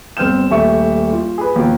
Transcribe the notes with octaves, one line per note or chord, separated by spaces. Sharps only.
G1 C4 F6 G6 E7
D#1 A3 E5 C#6
F4
G#4 B4
D#2 B2 F3